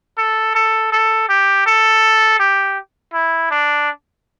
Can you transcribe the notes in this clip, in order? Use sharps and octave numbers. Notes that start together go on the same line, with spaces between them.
A4
A4
A4
G4
A4
G4
E4
D4